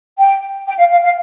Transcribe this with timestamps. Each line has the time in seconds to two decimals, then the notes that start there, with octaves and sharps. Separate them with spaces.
0.18 G5
0.67 G5
0.79 F5
0.91 F5
1.03 F5